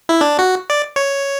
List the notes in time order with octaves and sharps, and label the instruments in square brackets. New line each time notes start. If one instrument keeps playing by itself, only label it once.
[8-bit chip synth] E4
D4
F#4
D5
C#5